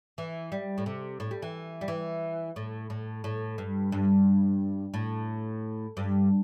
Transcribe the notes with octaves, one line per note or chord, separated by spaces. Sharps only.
E3
G3
A2
C3
A2
G3
E3
G3
E3
A2
A2
A2
G2
G2
A2
G2